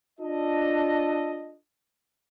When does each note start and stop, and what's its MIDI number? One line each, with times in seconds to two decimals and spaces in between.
0.20 1.55 62
0.20 1.55 65
0.20 1.55 69
0.20 1.55 75